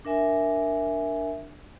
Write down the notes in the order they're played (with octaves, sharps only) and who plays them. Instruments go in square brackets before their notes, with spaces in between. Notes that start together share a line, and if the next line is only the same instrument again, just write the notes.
[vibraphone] D4 A#4 E5 G#5